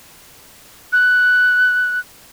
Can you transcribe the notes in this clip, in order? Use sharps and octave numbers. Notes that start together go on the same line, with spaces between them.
F#6